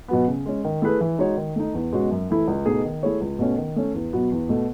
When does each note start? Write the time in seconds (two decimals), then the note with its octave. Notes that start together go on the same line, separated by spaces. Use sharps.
0.08 B2 F#3 B3
0.28 C#3
0.46 G#3 C#4
0.64 D#3
0.82 A3 E4 G#4 B4
1.01 E3
1.18 G#3 D#4 F#4 C#5
1.37 D#3
1.56 A3 D#4
1.74 E2
1.93 B2 G#3 C#4 F#4
2.11 F#2
2.30 E3 A3 E4 A4
2.48 C#2
2.66 B2 A3 D#4 G#4
2.85 D#3
3.03 A3 E4 G#4 C#5
3.21 C#2
3.39 B2 A3 C#4
3.57 D#3
3.76 A3 C#4
3.94 E2
4.13 B2 F#3 B3 F#4
4.32 E2
4.49 B2 A3